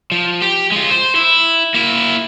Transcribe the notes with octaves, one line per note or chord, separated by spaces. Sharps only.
F3
G4
G#3 F4
C5
E4
A#3 E4